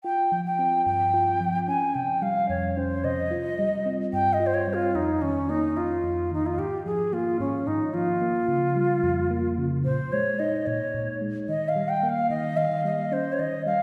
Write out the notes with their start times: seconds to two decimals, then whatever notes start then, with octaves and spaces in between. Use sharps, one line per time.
0.04 F4 G5
0.32 F3
0.46 G5
0.59 C4
0.86 G2 G5
1.14 F4
1.41 F3
1.68 C#4 G#5
1.95 C3 G5
2.22 G3 F5
2.49 F2 C#5
2.77 C#4 C5
3.04 C3 D#5
3.31 F4
3.59 G3
3.86 C4
4.13 G2 G5
4.33 D#5
4.40 F4
4.47 C5
4.54 C#5
4.68 G3
4.74 F4
4.95 F2 D#4
5.22 D#3 C#4
5.49 A#3 D#4
5.77 F2 F4
6.04 F2
6.31 D#3 D#4
6.46 F4
6.58 G#2 G4
6.85 F3 G#4
7.13 A#3 F4
7.40 G#2 C#4
7.67 G#2 D#4
7.94 F3 F4
8.22 A#3
8.49 C#3
8.76 G3
9.03 F2
9.30 A#3
9.58 C#3
9.85 A#2 C5
10.12 G#3 C#5
10.39 D#4 D#5
10.66 A#2 C#5
10.94 A#2
11.21 G#3
11.49 D#3 D#5
11.69 F5
11.76 G3
11.89 G5
12.03 A#3
12.09 F5
12.30 D#3 D#5
12.57 D#3 F5
12.84 G3 D#5
13.12 C#4 C5
13.33 C#5
13.39 D#3 D#5
13.66 G3 F5